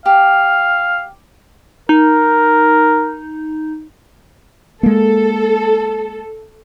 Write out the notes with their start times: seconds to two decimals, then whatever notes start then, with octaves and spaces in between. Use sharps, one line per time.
0.06 G4 F5
1.89 D#4 A#4
4.83 G#3 A#3 A4